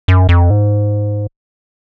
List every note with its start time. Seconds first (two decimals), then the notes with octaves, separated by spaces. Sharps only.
0.08 F#2
0.29 F2
0.50 G#2